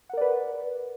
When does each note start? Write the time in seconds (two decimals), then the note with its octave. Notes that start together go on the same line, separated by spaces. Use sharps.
0.09 F#5
0.13 A#4
0.17 D5
0.21 B4